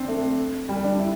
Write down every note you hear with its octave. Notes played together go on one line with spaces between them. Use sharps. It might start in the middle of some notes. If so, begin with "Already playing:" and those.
Already playing: C4 D4
A3
G3
D4
E4